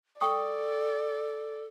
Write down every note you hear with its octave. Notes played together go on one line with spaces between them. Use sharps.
A4 D5 G5 C#6 D#6